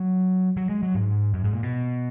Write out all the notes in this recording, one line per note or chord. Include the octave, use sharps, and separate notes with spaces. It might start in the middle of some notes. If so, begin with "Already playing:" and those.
Already playing: F#3
F#3
G#3
F#3
G#2
F#2
G#2
A#2
B2